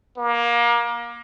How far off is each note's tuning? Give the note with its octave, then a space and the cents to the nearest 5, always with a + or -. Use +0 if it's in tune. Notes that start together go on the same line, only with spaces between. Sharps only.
A#3 +25